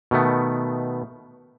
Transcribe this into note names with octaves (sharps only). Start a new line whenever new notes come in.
B2 D#3 A3 B3